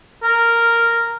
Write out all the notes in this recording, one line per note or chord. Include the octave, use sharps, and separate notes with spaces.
A#4